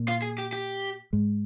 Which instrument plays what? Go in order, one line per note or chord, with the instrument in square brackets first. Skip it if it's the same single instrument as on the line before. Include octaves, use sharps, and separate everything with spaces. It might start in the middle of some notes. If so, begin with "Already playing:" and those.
Already playing: [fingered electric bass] A#2 A#3
[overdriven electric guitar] F4
G#4
G4
G4
[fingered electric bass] G#2 G#3